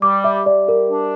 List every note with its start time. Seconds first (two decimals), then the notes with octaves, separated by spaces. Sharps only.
0.02 G3 D6
0.24 E5
0.46 G3 D5
0.68 A#4
0.90 D4